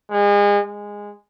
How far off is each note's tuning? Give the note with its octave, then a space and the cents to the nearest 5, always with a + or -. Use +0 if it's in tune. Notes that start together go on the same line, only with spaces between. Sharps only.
G#3 -35
G#3 -15